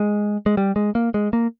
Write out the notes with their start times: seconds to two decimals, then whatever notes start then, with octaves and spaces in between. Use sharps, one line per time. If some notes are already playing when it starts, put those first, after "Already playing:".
Already playing: G#3
0.46 G#3
0.57 G3
0.76 G#3
0.95 A#3
1.14 G#3
1.33 A#3